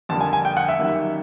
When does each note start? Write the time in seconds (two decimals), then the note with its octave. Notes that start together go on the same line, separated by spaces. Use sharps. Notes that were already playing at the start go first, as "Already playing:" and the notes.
0.09 F2 D3 G3 A#3 A5
0.21 G#5
0.33 G#5
0.45 G5
0.57 F#5
0.69 E5
0.79 F#2 D#3 G3 A#3